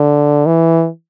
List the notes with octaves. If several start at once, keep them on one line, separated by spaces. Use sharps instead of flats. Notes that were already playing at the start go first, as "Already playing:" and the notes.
Already playing: D3
E3